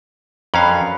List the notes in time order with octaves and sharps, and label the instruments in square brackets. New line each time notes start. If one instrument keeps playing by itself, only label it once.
[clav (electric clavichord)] F2 C#4 F5 [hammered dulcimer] D3 G#4 B4 [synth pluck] A#5
[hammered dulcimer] F#2